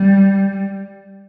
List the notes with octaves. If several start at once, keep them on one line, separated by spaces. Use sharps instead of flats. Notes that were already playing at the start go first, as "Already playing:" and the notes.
Already playing: G3